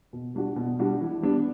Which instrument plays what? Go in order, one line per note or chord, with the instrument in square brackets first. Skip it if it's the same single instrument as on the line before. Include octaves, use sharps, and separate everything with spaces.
[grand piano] B2
G3 D4 F#4
B2
G3 D4 F#4
E3
G3 B3 D4